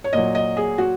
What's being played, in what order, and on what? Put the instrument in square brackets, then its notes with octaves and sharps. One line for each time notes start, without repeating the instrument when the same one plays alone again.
[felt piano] C#5
A#2 F#3 D#5
D#5
G#4
F#4